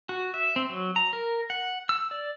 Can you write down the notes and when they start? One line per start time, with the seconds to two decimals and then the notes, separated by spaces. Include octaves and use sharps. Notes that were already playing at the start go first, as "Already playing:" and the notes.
0.09 F#4
0.34 E5
0.56 C4
0.69 F#3
0.96 A#5
1.13 A#4
1.50 F#5
1.89 E6
2.11 D5